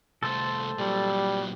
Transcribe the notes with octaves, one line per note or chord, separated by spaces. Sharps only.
C2 A3 A4 C5
A#2 F#3 G3